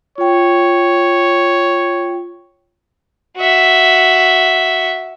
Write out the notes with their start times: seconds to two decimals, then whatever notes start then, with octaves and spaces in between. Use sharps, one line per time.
0.18 F4 C#5 G5
3.37 F#4 E5